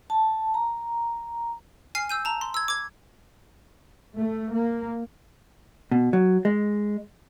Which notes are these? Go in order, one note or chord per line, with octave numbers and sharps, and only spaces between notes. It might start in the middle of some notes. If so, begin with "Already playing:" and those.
A5
A#5
G#5 F6 C7
E6 G6 D#7
A5 A#5
C6
E6 G#6
D6 G#6
A3
A#3
B2
F#3
G#3